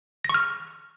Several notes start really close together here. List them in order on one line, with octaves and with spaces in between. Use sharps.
A#6 C#6 F6